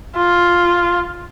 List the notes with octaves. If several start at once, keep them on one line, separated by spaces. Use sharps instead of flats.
F4